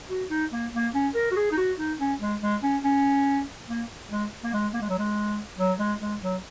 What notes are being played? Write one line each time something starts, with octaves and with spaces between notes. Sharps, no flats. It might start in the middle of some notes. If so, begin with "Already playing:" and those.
F#4
D#4
A#3
A#3
C#4
A#4
F#4
G#4
D#4
F#4
D#4
C#4
G#3
G#3
C#4
C#4
A#3
G#3
A#3
G#3
A#3
G#3
F#3
G#3
F#3
G#3
G#3
F#3